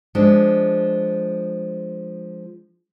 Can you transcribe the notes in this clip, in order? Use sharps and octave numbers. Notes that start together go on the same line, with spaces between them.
F3 G#3 D4